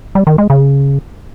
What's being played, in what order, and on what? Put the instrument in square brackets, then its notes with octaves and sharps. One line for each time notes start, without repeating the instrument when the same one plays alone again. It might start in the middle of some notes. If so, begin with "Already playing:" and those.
[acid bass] G3
D#3
G#3
C#3